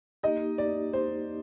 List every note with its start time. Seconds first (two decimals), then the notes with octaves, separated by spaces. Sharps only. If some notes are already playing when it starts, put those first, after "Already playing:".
0.23 A#3 D#4 G4 D#5
0.58 D5
0.93 C5